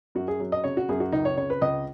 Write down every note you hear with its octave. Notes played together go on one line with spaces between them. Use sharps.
F#2 F#4
G#4
F#3
D#5
C#3 C#5
F#4
F#2 G#4
F#4
C#2 D#4
C#5
C#3 C#5
B4
C#2 D#5